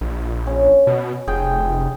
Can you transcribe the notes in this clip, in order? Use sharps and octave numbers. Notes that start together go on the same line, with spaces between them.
A#1
C#4
B2
F1 G#4 G5